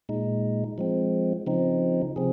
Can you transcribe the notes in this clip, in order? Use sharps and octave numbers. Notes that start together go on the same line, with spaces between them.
A#2 G#3 D#4
F3 G#3 C4
C#3 F3 C4 D#4
C3 F3 C4 G#4